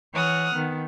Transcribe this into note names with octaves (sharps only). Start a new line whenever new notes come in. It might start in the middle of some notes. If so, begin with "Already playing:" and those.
E3 C#5 F#5 D#6 F6
D#3 B3